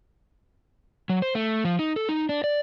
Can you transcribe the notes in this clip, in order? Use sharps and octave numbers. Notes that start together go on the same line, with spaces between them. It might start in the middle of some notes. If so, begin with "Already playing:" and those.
F#3
C5
A3
F3
D#4
A4
D#4
D4
D5